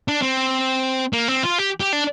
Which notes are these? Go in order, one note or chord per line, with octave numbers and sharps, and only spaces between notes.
D4
C4
A#3
C4
F4
G4
G4
D4